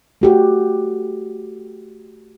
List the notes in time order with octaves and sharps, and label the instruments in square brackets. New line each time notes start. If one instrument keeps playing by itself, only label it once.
[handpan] A3 F#4 G4